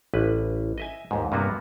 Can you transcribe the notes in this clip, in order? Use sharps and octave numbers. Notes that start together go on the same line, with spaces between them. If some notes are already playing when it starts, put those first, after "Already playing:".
A1 B4
D#5 E5 G#5
D#2 G#2
G2 C3 A#3 B3 F#4